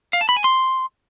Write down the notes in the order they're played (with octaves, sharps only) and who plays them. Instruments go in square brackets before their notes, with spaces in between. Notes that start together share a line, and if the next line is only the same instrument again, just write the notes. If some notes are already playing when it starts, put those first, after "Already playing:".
[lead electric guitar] F5
A5
B5
G#5
C6